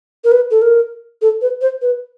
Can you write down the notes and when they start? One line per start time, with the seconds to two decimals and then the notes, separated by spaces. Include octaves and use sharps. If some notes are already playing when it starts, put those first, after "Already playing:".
0.24 A#4
0.32 B4
0.51 A4
0.62 A#4
1.22 A4
1.41 B4
1.61 C5
1.82 B4